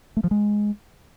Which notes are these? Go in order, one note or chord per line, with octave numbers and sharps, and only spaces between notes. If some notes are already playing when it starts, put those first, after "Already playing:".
A3
F3
G#3